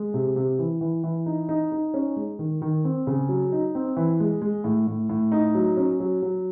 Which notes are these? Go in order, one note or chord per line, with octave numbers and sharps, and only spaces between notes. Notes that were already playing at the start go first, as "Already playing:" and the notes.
Already playing: G#3
C3
C3
E3
E3
E3
D#4
D#4
D#4
C#4
G#3
D#3
D#3
C4
C#3
F#3
D#4
C4
E3
G#3
G#3
A2
A2
A2
D#4
F#3
C#4
F#3
F#3